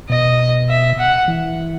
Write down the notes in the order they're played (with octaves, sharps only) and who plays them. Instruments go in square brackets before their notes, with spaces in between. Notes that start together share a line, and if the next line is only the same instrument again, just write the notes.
[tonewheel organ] B2 [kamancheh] D#5
[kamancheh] E5
F#5
[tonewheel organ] E3